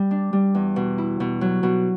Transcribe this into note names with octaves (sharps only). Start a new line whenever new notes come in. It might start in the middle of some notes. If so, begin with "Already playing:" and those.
Already playing: G3
D4
G3
E2
B2
E4
B2
F#3
B2